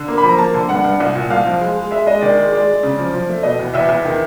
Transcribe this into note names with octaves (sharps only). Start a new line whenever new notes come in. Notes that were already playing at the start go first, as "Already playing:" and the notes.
Already playing: D3
A#3
B5
F3
A#5
A#3 A5
D3
G2 F#5
G2
C2
A#2
C2 F5
F3
G#3
G#3
G#3 E5
G#3 D#5
D#3 D5
G#3
G#3 D5
G#3
C#3
F3
F3
A3
B2 D#5
E2
E2 E5
E2
D#3